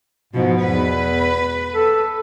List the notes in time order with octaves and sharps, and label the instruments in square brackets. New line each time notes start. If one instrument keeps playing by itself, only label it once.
[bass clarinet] G#2 [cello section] B2 F3
[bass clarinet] E2 [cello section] B4
[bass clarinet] A4